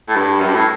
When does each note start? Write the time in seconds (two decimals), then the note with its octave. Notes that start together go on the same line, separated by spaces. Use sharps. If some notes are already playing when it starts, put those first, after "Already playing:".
0.08 A2
0.16 G2
0.40 F#2
0.47 G2
0.55 A2